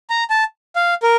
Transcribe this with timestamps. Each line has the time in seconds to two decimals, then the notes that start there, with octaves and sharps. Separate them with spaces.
0.10 A#5
0.30 A5
0.76 F5
1.03 A#4